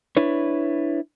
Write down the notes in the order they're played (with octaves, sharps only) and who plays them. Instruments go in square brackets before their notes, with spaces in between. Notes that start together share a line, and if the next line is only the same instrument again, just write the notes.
[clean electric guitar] D4 E4 B4 C#5